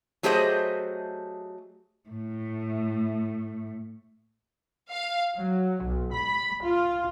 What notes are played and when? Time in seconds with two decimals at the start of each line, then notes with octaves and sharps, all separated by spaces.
0.23 F#3 A3 G4 G#4 C5 D#5
2.09 A2 A3
4.91 F5
5.36 F#3
5.84 B1
6.15 B5
6.63 F4